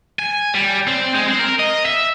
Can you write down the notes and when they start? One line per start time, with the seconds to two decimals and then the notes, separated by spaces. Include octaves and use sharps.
0.19 G#5
0.55 G3
0.88 C4
1.15 G#3
1.28 C4
1.39 A#4
1.59 D#5
1.85 E5